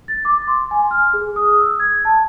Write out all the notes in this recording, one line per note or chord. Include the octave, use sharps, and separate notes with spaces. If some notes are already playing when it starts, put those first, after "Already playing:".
A6
D6
C6
G#5
F6
G#4
D#6
E6
G#6
A5